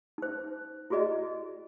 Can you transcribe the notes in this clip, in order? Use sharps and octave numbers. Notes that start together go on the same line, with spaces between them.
D#4 C5
E4 F#4 G#4 D5 D#5